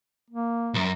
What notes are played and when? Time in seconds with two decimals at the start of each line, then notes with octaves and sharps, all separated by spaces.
0.30 A#3
0.74 B1 F#2